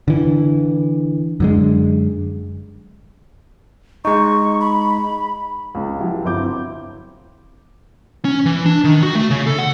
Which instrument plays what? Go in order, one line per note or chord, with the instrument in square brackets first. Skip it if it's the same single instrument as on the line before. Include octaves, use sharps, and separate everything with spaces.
[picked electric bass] D3 E3
F#2 D3 G#3
[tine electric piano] G#3 D#4 [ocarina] C#6
[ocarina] B5
[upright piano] C#2 C#3
F3 F#3 E4 G4
G1 C4 E4 C5 D6 G6
[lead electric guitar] C#4
E3
D4
D#3
F#4
A3
C#3
A4
F#5